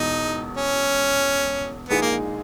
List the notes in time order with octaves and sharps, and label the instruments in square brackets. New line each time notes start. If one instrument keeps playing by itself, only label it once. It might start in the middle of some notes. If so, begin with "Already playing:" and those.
Already playing: [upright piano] E1 E2 B2 G#3 [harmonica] D#4
[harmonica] C#4
[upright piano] A#1 A#2 G#3 D#4 G#4 [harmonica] B3
[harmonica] A#3